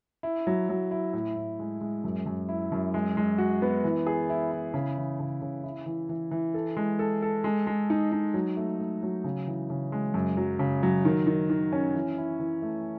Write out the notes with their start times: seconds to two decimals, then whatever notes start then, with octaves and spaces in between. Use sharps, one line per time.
0.23 E4
0.47 F#3
0.69 F#3
0.91 E4
1.13 A2
1.36 A2
1.59 G#3
1.81 G#3
2.04 F#2
2.26 F#2
2.49 E4
2.72 F#2
2.94 G#3
3.17 G#3
3.38 F#4
3.62 B3
3.84 E3
4.06 G#4
4.30 E4
4.52 E4
4.74 C#3
4.97 E3
5.20 C#3
5.42 C#3
5.64 E4
5.86 E3
6.09 E3
6.31 E3
6.54 A4
6.77 G#3
6.99 A4
7.22 A4
7.44 G#3
7.67 G#3
7.90 D#4
8.12 D#4
8.34 F#3
8.57 A3
8.79 A3
9.03 F#3
9.24 C#3
9.47 E3
9.70 C#3
9.92 G#3
10.14 F#2
10.37 F#3
10.59 C#3
10.83 F#3
11.05 D#3
11.27 D#3
11.50 D#3
11.73 C#4
11.94 E3
12.18 E4
12.40 E3
12.62 A3